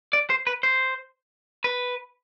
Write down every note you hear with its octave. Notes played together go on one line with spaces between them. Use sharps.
D5
C5
B4
C5
B4